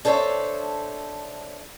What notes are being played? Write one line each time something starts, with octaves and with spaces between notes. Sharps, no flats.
D4 A4 C5 C#5 E5